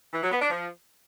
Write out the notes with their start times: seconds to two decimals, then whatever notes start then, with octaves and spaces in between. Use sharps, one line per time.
0.13 E3
0.23 F#3
0.32 B3
0.41 D4
0.50 F3